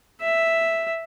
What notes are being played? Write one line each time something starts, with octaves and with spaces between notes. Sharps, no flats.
E5